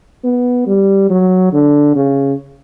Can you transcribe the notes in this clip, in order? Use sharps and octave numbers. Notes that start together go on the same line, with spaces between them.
B3
G3
F#3
D3
C#3